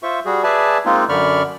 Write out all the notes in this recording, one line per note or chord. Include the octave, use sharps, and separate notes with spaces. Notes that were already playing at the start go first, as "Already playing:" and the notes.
F4 C5 E5 C#6
G3 F#4 G#4
G#4 B4 D5 E5 G#5 A5
G#3 A#3 C4 D#4 F4
F#2 D3 D5 B5 C#6 F6